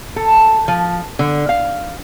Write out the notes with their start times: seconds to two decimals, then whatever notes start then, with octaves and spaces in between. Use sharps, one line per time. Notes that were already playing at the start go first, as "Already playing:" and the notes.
0.16 A4
0.68 F3
1.19 D3
1.49 F5